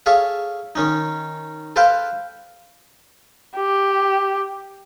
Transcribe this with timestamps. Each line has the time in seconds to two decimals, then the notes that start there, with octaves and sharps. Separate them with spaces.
0.06 G#4 A4 C#5 E5 F5
0.75 D#3 C#4 D#4
1.76 A4 B4 C5 F5 G5
3.57 G4